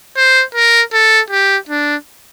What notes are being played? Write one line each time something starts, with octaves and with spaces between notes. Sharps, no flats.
C5
A#4
A4
G4
D4